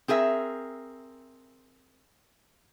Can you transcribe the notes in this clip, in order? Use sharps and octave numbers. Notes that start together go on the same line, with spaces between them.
C4 G#4 A#4 E5